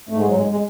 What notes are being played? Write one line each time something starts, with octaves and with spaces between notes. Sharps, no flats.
G#2 A3
G#3
F#3
G#2 G#3
G#3